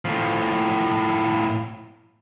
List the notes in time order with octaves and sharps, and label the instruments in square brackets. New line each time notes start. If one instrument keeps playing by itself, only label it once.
[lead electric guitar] A2 F3